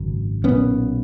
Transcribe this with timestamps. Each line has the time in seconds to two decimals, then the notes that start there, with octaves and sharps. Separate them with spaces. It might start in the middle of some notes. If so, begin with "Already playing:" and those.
Already playing: G#1 F#2 C#3
0.44 B1 A#2 B3 C#4